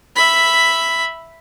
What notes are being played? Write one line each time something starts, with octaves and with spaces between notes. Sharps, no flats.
E5 B5